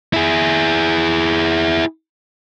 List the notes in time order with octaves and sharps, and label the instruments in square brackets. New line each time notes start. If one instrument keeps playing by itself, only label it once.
[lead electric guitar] E4 G#4